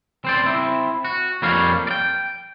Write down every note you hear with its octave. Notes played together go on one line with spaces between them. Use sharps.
C4 C5 D5
C4 E4
F#4
F2 G3 A#3 C#5 F5
D5 G5